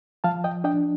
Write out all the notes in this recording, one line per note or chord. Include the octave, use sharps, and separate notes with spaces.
F3 F5 A5
D#5 G5
D4 D#5 G5